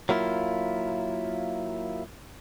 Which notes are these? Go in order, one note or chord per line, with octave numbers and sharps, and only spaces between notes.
F#3 A#3 E4 F4